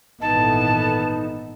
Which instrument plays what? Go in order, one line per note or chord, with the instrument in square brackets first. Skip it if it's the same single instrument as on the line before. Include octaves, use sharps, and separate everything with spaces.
[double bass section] G#1 A#2 E3 [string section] B3 A4 [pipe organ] D#4 [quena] A5